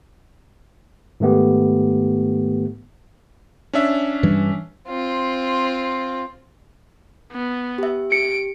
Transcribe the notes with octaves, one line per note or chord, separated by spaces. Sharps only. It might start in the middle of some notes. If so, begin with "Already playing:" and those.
G#2 D#3 A3 B3 G4
C#4 D4 E5
G2 E3 G3
C4 F4
B3
G4 E5
G4 C#7 D7